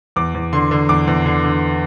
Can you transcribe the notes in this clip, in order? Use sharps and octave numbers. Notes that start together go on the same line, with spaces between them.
E2 D6
E2
D3 C6
D3
E2 D6
E2
D3
D3